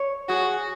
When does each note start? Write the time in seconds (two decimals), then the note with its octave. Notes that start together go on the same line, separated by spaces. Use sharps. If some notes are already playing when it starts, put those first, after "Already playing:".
Already playing: C#5
0.28 F#4 G#4